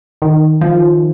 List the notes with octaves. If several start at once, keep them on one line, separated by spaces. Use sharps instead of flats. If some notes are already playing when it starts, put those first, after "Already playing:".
D#3
F3